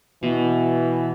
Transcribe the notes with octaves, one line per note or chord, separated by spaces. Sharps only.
B2 E3